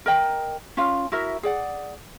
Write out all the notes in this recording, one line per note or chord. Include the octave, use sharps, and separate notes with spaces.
A#4 D#5 G5
C#4 F4 F5
E4 F#4 A#4 E5
G#4 D5 F#5